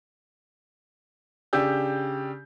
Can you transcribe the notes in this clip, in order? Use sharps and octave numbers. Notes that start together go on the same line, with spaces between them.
C#3 D4 G4 E6 G6